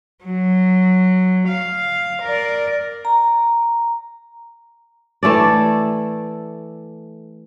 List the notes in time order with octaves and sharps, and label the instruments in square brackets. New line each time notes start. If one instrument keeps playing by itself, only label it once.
[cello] F#3
F5
A#4 D5
[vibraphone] A#5
[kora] E3 A3 A4 D5